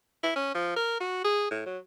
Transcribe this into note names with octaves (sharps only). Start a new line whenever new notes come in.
E4
C#4
F3
A#4
F#4
G#4
A2
F#3